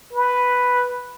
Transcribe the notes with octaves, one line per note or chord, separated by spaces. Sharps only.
B4